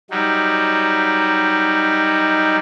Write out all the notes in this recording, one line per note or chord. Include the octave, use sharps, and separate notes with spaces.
F#3 G3 D#4